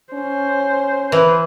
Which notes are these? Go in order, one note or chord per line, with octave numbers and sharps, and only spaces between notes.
C#4 C5
E3 B4